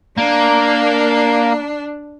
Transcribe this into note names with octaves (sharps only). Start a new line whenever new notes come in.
A#3 D4